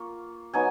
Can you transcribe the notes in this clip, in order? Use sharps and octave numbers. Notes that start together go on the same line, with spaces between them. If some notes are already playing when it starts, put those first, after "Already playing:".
Already playing: A#3 F4 C#6
F#3 B3 D#4 G#5